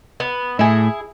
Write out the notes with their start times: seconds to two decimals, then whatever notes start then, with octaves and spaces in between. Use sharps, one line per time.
0.20 B3
0.59 A2 A3 E4 G#4